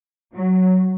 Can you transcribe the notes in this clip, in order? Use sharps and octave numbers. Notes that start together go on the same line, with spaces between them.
F#3